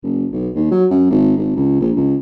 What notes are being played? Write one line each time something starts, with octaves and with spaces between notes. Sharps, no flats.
F#1
B1
D#2
F#3
F#2
G#1
G#1
C#2
A#1
C#2